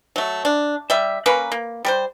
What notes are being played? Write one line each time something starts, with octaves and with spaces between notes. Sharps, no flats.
F#3 A3
D4
G3 E5
A#3 C#4 A#4 B4
A#3
G3 A#4 C5